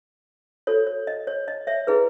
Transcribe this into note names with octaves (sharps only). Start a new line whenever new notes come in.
F#4 A4 C#5
C#5
D#5
C#5
D#5
C#5 E5
E4 G#4 B4